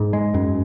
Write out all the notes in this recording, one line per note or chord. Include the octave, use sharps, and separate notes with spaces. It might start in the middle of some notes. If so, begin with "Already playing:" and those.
Already playing: G#2
G#3
F#2